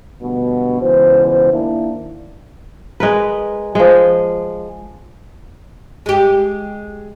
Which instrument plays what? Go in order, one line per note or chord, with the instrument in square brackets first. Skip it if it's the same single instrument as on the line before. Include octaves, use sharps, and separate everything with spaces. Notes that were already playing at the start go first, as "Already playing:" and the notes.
[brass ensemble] D2 G2 B2
C#2 B2 E3 C5
D#3 A#3 D4 E4
[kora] G#3 A#4 B4
F3 G#3
[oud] G#3 G4